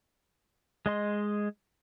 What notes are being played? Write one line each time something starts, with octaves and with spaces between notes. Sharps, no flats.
G#3 D#5 C6